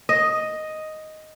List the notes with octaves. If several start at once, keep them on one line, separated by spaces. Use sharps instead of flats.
D#5